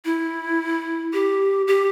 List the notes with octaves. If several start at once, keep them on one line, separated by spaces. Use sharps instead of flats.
E4
G4
G4